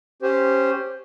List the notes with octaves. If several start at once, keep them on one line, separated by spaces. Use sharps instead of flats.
C#4 G4 C5